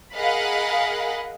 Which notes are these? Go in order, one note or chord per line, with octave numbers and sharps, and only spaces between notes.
G#4 A#4 D#5 F5 F#5 B5